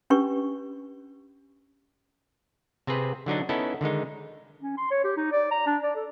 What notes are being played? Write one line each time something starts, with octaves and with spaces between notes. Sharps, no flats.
C#4 D4 G4 B4 C#6
C3 C4 G#4 B4
D3 F#3 D4 D#4
B3 C#4 D#4 E4 A4
D3 D#3 G#3 D#4
C#4
C6
C#5
G4
D#4
D5
A#5
D4
D5
A4